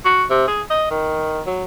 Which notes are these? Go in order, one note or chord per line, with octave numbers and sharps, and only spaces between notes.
F#4
C3
G#4
D#5
D#3
F#3